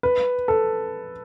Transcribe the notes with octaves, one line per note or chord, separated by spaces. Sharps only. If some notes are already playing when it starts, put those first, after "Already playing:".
B4
A4